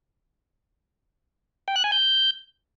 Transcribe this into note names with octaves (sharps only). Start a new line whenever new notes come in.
G5
F#6
G#5
G6